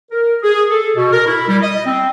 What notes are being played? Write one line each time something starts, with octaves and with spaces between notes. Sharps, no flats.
A#4
G#4
A4
B2
A#4
E4
G3
D#5
C4